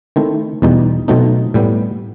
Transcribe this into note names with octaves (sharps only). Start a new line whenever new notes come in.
D#3 A3 C4 E4
E2 B2 G3 D#4
B2 F#3 A3 C4 D#4
A2 G3 B3